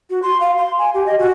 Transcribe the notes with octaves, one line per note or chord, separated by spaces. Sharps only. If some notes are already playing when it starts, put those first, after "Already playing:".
F#4
C6
F5
C6
G#5
G4
D#5
F#4